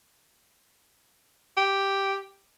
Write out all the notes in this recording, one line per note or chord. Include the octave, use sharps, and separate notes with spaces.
G4